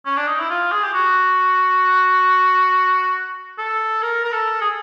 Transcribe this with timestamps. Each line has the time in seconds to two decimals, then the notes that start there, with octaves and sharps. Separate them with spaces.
0.06 C#4
0.17 D4
0.28 D#4
0.39 E4
0.50 F4
0.72 G#4
0.83 G4
0.94 F#4
3.58 A4
4.03 A#4
4.25 A#4
4.32 A4
4.61 G#4